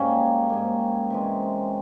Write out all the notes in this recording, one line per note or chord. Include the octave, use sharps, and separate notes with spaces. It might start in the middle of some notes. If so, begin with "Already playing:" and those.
Already playing: G#2 G3 A#3 C#4
G#2 G3 A#3
C3 E3 G#3